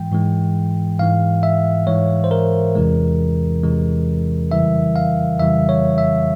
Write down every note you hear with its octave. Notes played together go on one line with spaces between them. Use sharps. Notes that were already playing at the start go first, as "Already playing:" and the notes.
Already playing: G#2 E3 G#3 G5
G#2 E3 G#3
G#2 E3 G#3 F5
E5
G#2 E3 G#3 C#5
C5
A#4
E2 C3 E3 G#3
E2 C3 E3 G#3
F2 C#3 E3 G3 E5
F5
F2 C#3 E3 G3 E5
C#5
E5